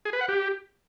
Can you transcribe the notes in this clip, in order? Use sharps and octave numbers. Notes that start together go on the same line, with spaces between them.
G#4
B4
F#5
G4